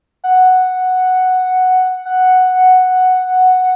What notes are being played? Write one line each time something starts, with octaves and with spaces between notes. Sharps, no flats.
F#5
F#5